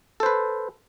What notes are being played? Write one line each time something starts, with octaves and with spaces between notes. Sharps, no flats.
A4 B4 C5